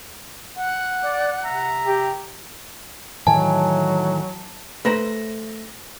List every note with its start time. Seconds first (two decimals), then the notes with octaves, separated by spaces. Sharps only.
0.57 F#5
1.03 D5
1.44 C3 E5 A#5
1.85 G4
3.27 A2 D#3 E3 F#3 G#5 A5
4.85 A3 B4 C5 A#5 A#6